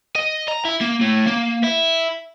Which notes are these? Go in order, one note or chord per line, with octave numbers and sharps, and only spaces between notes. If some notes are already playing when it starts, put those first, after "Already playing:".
D#5
A#5
E4
A#3
A2
A#3
E4